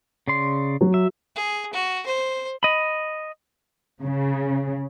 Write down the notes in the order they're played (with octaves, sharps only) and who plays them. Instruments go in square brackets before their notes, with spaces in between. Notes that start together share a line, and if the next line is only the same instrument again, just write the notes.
[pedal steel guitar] C#3 D5 C6
[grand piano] F#3
[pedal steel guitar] E5
[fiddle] G#4
F#4
C5
[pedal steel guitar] D#5 B5
[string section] C#3